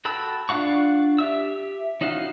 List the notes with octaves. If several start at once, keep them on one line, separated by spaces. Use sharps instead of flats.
F#4 A4 G5 B5 E6
D4 F4 F5 F#5 C#6
G4 E5 E6
C#4 D#4 E4 F#4 F5